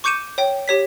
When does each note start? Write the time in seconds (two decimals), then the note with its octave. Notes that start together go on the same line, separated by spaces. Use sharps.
0.04 C#6 D6 G6 C#7 D#7 E7
0.38 C#5 G5
0.68 G4 C#5 B6